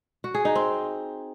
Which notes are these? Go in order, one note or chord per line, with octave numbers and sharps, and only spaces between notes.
F#4
G#4
D#4
C4